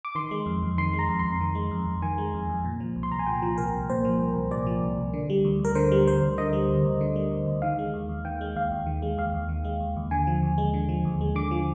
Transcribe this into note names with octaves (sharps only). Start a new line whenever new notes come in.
D6
D#3 C6
G#3
F2
F2
D#3 C6
G#3
A#5
F2
C6
F2
D#3
G#3
F2
F2
D#3 G#5
G#3
F2
F2
A#2
F3
C2
C6
C2 A#5
G#5
A#2 G5
F3
C2 A#4
C2
A#2 C5
F3
C2
C2
A#2 D5
F3
C2
C2
D3
G3
D2
D2
A#4
D3 C5
G3
D2 C5
D2
D3 D#5
G3
D2
D2
D3
G3
D2
D2
D#3 F5
G#3
D#2
D#2
D#3 G5
G#3
D#2 F5
D#2
D#3
G#3
D#2 F5
D#2
D#3
G#3
D#2
D#2
D3 G#5
F3
D#2
G#3
D3
F3
D#2
G#3
D3 D6
F3